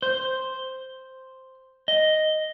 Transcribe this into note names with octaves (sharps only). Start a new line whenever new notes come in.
C5
D#5